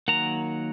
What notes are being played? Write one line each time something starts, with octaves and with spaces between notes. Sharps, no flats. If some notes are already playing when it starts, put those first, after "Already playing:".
D#3 F#3 A#3 F#5 A#5